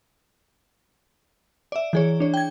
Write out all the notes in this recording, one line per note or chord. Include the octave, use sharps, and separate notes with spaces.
D5 E5
E3 G#4 C#5
D4 C#5
G5 G#6